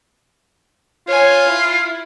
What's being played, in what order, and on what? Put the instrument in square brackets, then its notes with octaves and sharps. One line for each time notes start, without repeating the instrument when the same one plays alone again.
[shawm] F4 [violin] C#5 G#5
[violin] E4